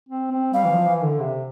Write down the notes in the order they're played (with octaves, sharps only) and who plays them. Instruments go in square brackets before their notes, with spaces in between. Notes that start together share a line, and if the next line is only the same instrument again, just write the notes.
[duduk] C4
C4
[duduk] G3 [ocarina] F5
[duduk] E3
F3
E3
D3
C3